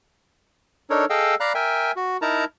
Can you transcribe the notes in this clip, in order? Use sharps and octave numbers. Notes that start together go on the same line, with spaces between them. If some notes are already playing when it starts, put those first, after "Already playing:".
D4 D#4 A4 A#4 C#5
G#4 A4 D#5 F5 G5 E6
D5 F5 A#5 B5 F#6
A#4 E5 G5 G#5
F#4
D#4 E4 A#4 A5 A#5